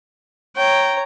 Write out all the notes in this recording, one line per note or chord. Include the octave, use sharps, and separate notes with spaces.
C#5 G5 A#5